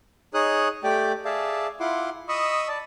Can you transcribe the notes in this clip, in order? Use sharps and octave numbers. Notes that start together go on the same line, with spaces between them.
D#4 G#4 C#5 D#6 F#6
A3 G4 D5 G5 D6
G#4 D5 E5 F5 A5
E4 F4 F#5 C6 D6
D#5 B5 C#6 D#6 E6
D5 A5